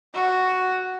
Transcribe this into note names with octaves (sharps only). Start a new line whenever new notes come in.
F#4